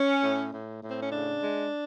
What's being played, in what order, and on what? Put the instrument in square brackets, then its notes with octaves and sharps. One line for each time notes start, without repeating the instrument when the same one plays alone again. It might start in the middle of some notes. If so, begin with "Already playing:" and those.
Already playing: [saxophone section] C#4
A2
A2
A2
C4
C#4
C#3 D4
G#3